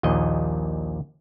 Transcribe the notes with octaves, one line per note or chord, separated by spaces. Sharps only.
A#1 D#2 A#2 D#5